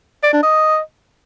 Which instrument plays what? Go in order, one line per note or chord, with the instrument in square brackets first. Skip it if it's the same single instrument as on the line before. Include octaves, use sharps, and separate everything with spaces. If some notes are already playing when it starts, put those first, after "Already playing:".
[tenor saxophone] D5
D4
D#5